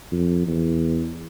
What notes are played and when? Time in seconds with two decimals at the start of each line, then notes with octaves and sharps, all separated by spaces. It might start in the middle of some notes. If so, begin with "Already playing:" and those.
0.12 F2
0.47 E2